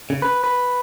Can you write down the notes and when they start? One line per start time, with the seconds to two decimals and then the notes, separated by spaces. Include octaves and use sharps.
0.10 C#3
0.22 B4
0.44 B4